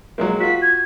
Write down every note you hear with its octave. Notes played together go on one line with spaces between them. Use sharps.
F#3 G#3 A#3
F4 F#4 B6
G#6